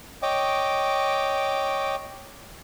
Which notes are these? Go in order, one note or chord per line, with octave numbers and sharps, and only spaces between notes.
C#5 D#5 G5 D6